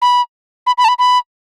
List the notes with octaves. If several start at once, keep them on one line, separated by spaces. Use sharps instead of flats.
B5
B5
B5
A5
B5
B5